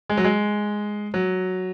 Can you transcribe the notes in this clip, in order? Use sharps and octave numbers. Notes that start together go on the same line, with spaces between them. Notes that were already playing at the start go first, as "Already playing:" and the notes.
G#3
F#3
G#3
F#3